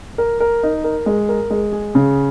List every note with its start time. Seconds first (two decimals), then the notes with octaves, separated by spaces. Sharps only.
0.18 A#4
0.40 A#4
0.63 D#4
0.84 A#4
1.06 G#3
1.29 A#4
1.50 G#3
1.72 G#4
1.95 C#3